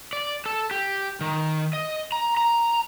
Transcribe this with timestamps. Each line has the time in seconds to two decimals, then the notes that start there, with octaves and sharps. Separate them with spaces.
0.13 D5
0.46 A4
0.71 G4
1.21 D#3
1.73 D#5
2.12 A#5
2.37 A#5